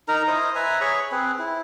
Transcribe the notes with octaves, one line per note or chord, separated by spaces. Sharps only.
D#4 A#4 A#5
E4 C5 D#5 D#6
B4 E5 G#5 A#5
G#4 C#5 B5 C#6
C4 G#4 B4
E4